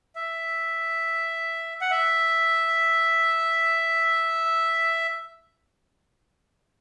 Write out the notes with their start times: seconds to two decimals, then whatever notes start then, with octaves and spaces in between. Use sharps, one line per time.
0.15 E5
1.81 F#5
1.91 E5